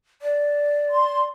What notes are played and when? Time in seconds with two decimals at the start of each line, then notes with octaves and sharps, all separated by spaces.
0.22 D5
0.90 C6